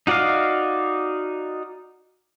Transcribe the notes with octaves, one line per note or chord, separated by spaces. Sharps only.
D#4 F#4 D5 D#5 F5